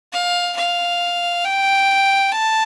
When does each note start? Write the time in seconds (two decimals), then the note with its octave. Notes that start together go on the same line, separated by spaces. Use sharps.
0.12 F5
0.56 F5
1.44 G5
2.32 A5